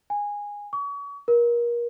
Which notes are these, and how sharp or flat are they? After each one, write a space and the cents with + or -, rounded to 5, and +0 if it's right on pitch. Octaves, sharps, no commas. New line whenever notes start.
G#5 -15
C#6 +40
A#4 +30